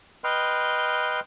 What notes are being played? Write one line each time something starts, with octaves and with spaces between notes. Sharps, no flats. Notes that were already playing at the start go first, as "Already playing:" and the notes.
B4 D#5 G5 C6 F6